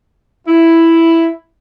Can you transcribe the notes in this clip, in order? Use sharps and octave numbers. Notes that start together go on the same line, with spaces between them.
E4